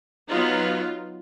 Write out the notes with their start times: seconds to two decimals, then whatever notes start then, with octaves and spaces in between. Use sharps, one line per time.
0.28 F#3 B3 D#4 F4